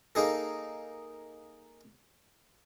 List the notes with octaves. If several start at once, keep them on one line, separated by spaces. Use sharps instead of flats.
A#3 D#4 G#4 A4